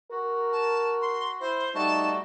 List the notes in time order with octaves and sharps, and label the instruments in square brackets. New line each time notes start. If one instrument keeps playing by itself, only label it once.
[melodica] F#4 [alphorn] A#4
[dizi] A5
C6
[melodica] E4 C6 [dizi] C5
[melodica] G3 A3 F#4 [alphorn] D#4 [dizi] A5